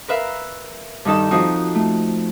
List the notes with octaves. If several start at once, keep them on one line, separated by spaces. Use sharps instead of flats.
A#4 B4 E5 F5
G2 D#3 D#4 A4 A5
F3 C4 D#4 F#4
A3